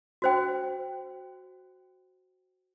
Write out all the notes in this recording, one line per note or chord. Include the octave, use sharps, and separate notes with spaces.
F#4 C5 G5